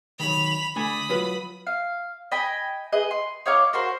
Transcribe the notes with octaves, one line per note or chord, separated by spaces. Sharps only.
D#3 F#3 B5 F7
D3 A3 G#5 B5 D#6
F#3 F4 B4
F5
D#5 G5 G#5 B5
G#4 B4 D#5
C6
D#4 C#5 F5 D6
F#4 A#4 C5 C6